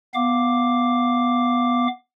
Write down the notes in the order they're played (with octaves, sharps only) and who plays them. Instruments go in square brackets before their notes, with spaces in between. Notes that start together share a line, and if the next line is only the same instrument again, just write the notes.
[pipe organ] B3 F5 D6